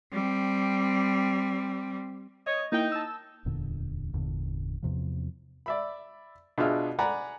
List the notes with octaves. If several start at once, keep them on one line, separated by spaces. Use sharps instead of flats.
G3 C4
C#5 D#5
A#3 D#4 E4 G5
A5 E6
D1 E2 A#2 D3
G1 E2 A#2 D3
E2 C3 F3
D5 E5 B5
B2 D4 F4 G#4 E5 F6
D5 F#5 G#5 A#5 B5